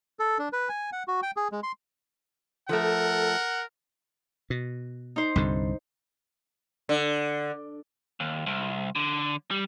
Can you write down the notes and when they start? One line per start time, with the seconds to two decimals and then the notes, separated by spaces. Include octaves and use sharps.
0.19 A4
0.39 D4
0.53 B4
0.69 G#5
0.92 F#5
1.08 F#4
1.23 G5
1.37 G#4
1.52 G#3
1.63 C6
2.69 F3 A3 A4 A#4 F#5
4.50 B2
5.16 D#4 C5
5.36 C2 G2 D3
6.89 D3
8.20 D#2
8.46 C2
8.96 D3
9.51 G3